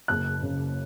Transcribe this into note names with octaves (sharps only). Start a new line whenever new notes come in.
F#1 F#6
C#3